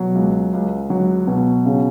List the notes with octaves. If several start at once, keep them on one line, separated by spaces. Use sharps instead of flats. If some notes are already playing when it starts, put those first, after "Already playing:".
Already playing: B2 F#3
C#2
C#2
F#3
B2
C#3